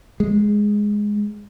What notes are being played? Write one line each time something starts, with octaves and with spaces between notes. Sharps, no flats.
G#3